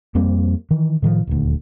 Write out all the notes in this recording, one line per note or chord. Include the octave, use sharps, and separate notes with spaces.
F2 G3 A#3 C4
D#3 E3
A2 D#3 F3
D#1 D2